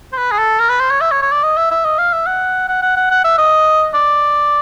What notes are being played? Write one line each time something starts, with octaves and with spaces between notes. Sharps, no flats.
C5
B4
G#4
A4
A#4
B4
C5
C#5
E5
C#5
C#5
D5
D#5
E5
E5
D#5
F5
E5
F#5
F#5
F#5
F#5
F#5
E5
D#5
D5